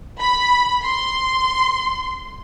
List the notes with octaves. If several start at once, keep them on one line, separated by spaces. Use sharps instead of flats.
B5
C6